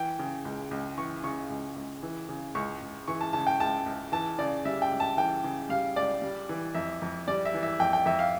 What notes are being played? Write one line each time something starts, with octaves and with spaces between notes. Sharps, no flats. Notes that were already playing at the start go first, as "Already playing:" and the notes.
Already playing: E3 G5
C#3
C#2
C#2
E3 C#6
C#3 C#6
C#2
C#2
E3
C#3
C#2 C#6
C#2
E3 C#6
A5
C#3 A5
G5
C#2 A5
C#2
E3 A5
C#3 D5
G3 E5
G5
C#2
A5
E3 G5
C#3
G3 F5
C#2 D5
G3
E3
F2 E5
F2
G3 D5
E5
E3
E5
F2 G5
G5
F2 E5
F5